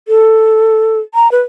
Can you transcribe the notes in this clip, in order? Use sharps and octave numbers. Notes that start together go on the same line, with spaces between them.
A4
A#5
B4